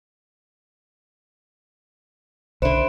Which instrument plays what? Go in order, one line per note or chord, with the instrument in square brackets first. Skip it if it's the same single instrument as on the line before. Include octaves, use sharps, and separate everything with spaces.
[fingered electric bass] B1 D3 [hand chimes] C5 [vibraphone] D5 E5 B5